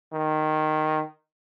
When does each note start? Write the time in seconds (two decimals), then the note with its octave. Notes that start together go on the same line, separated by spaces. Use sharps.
0.13 D#3